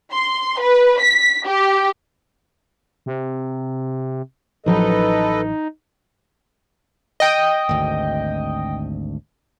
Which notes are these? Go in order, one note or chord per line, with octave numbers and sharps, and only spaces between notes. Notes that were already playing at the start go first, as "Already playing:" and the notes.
C6
B4
B6
G4
C3
A1 F3 F#3 D#4 A4 B4 D#5
D#5 G5
G#1 D2